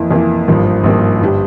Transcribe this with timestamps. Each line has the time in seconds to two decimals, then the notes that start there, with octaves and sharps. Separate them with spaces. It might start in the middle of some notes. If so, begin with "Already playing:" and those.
Already playing: F2 E3 A#3 E4
0.11 F2 E3 A#3 E4
0.48 G#1 G2 F3 A#3
0.84 G#1 G2 F3 A#3
1.21 G1 G3